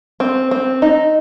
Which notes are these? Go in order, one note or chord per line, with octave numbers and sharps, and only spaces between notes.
C4
C4
D#4